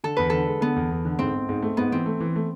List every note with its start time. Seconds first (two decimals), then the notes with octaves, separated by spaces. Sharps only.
0.04 D3 A4
0.17 E2 B4
0.30 D3 A4
0.47 G#3
0.61 D3 B3
0.76 E2
0.91 E2
1.05 D3
1.19 G#2 C4
1.34 G#2
1.49 G#2
1.62 A3
1.77 G#2 B3
1.92 E3 C4
2.06 A3
2.20 E3
2.36 A3